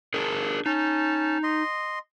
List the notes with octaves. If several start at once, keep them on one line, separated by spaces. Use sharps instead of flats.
D4 G#4 A#4
C#4 D#4 A5
D#5 C6